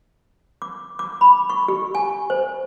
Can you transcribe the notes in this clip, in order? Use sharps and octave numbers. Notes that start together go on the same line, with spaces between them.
D6
D6
B5
C#6
G4
G#5
C5